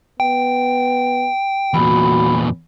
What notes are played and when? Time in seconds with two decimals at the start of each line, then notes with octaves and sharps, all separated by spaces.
0.20 B3 G5
1.74 E2 A#2 F#4 B5